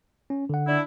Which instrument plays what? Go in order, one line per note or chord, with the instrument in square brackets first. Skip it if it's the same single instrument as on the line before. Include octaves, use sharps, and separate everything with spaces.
[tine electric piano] C#4
D3 F#5
[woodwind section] D4 E4